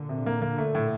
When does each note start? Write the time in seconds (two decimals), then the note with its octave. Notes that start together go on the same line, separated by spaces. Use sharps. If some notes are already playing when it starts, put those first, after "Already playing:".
Already playing: A#2 D3
0.09 C3
0.26 A#3
0.42 A#3
0.58 A3
0.75 A2